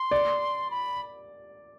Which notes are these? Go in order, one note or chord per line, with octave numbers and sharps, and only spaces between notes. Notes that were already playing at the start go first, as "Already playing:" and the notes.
Already playing: C6
D5
B5